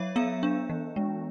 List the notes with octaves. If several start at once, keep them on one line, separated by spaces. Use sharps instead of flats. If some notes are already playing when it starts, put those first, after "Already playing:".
Already playing: F#3 C#5 E5
B3 F5
D4
E3
G#3